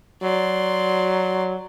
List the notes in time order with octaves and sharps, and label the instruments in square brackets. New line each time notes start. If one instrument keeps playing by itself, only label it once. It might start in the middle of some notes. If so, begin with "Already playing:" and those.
[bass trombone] F#3 [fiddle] D5 C6